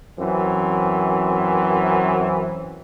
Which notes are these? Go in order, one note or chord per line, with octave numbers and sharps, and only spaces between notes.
F#2 E3 C4